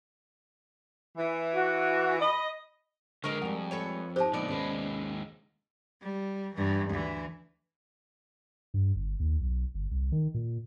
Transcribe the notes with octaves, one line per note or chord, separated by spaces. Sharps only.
E3
F#4
D#5 B5
D3 G#3 A#4 D#5 A#5 C#6
F2 G3 G#3 F#5
A4 B4 C#5
F3 D#4 G4 C5 D#5 A5
F2 A#2 B3 D5 D#5
D#2 G#3 C#4 B4
G3
G2 E3
D2 E3
G2
G1
D#2
B1
G1
C2
D#3
A#2